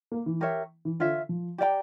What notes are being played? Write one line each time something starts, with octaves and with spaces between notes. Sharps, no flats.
A#3
E3
G4 A#4 C#5 E5
E3
D3 F4 C#5 E5
F3
G4 D5 G5 A#5